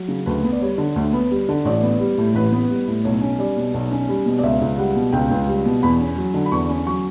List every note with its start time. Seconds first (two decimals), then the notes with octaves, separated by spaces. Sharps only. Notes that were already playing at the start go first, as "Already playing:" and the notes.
Already playing: F#3
0.08 C#3
0.26 D2 B4
0.43 B3
0.52 D5
0.61 G3 C#5
0.78 D3
0.96 D2
1.13 B3
1.31 G3
1.49 D3
1.65 A1 D5
1.82 B3
2.00 G3
2.18 A2
2.34 A1 B4
2.52 B3
2.70 G3
2.88 A2
3.04 B1 C#5
3.21 C#4
3.39 G3 D5
3.57 B2
3.74 B1
3.91 C#4
4.09 G3
4.26 B2
4.38 D5
4.43 C#2 E5
4.62 C#2
4.78 G3 F#5
4.96 B2
5.12 C#2 G5
5.31 C#2
5.48 G3
5.65 B2
5.83 E2 B5
6.00 C#4
6.17 F#3
6.34 D3
6.46 B5
6.52 E2 C#6
6.69 C#4
6.86 F#3 C#6